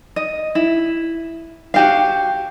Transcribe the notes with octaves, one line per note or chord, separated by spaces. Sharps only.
D#5
E4
F#4 G4 F5